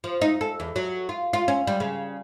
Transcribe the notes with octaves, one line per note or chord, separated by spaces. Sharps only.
F3
D#4
A4
E2
F#3
F4
F4
C#4
G3
C#3